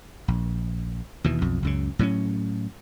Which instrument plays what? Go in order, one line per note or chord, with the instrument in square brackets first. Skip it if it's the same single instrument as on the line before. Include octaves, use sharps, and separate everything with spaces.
[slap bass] A#1
D#2 B2 E3
B1 F2
C#2 F#2 C#3
A2 F#3 A#3 C#4